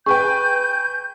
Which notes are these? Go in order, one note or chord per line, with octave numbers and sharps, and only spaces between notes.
G#4 B4 G5 C#6 G6